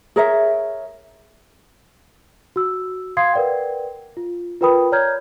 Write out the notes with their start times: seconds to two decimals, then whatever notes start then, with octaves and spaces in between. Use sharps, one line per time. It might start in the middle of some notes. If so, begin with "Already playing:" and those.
0.16 G#4 A#4 C#5 E5
2.56 F#4 E6
3.17 F5 C6 D#6 G#6 C7
3.33 A#4 B4 D5 F#5 G5
4.17 F4
4.61 F4 A#4 B4 G5 B5 D#6
4.92 C#5 D5 A#5 F6 G6 G#6